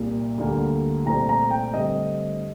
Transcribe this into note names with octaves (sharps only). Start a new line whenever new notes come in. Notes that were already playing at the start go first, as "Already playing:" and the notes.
Already playing: C2 A#2 G3 A#3
D2 D3 G3 A#3
C2 A#2 A3 C4 A#5
A#5
G5
G2 D3 A3 C4 D#5